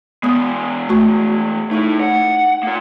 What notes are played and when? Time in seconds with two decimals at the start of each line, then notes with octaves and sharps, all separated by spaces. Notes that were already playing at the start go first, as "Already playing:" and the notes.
0.23 E3 G#3 B3 D#6
0.89 A3 F#4 C#6
1.71 A3 D#4 E4 C#6
2.00 F#5
2.63 A#3 F4